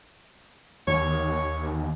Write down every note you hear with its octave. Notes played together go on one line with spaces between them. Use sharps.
D#2 C#5